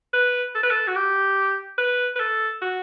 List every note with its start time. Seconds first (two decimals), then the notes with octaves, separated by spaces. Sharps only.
0.13 B4
0.55 A4
0.63 B4
0.71 A4
0.87 F#4
0.96 G4
1.78 B4
2.16 B4
2.20 A4
2.62 F#4